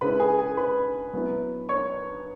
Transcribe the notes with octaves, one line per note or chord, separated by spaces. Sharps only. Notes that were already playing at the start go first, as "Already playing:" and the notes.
C#3 G#3 C#4 E4 B4 B5
G#4 G#5
G#4 G#5
B4 B5
F#3 B3 E4
C#5 C#6